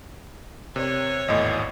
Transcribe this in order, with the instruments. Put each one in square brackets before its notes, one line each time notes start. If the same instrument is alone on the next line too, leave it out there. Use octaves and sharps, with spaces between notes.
[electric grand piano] C3 [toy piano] A#4 D5 [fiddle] C#5
[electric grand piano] G#1 E2 A2 [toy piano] D#5 G5 C6